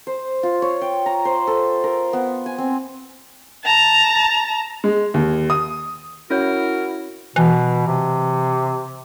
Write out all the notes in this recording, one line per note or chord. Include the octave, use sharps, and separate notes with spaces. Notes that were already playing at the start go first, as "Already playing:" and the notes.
C5
F4
C#5
G5
A#5
C5
A4
A#4
B3
G#5
C4
A5 A#5
G#3
D#2
D#6
C#4 E4 F#4 A#4 C#5
B2 E3
C3